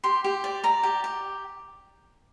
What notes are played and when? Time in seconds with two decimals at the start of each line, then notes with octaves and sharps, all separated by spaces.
0.04 G4 C6
0.24 G4
0.44 D5
0.64 D5 A#5
0.83 G4
1.04 G4